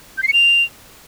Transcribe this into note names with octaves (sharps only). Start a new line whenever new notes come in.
G6
C7
C#7
F7